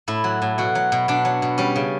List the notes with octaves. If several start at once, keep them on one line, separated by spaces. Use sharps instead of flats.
A2 E4
F#3
A2
B2 F#4
F#3
B2
B2 D4
F#3
B2
G3 C#4
C#3